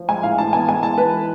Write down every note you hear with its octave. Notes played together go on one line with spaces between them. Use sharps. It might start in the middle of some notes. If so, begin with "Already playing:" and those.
Already playing: F3
G#3 G#5
A2 F5
E3 A5
B3 G#5
G#3 G#5
E3 A5
E3 B4
E3